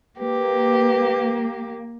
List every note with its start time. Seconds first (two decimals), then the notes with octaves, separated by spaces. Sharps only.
0.19 A#3 G4 B4